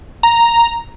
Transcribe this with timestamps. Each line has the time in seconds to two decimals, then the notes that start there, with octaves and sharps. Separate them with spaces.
0.23 A#5